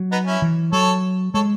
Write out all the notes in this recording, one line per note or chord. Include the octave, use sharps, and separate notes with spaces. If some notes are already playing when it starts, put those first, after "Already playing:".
Already playing: F#3
B3 D#4
C#4 E4
E3
F#3 A4 C#5
G#3 A4 C#5